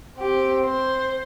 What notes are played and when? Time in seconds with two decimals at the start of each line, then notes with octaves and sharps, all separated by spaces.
0.19 C4 G4
0.65 C5